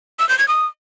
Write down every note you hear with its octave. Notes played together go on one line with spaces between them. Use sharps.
E6
G6
G#6
D#6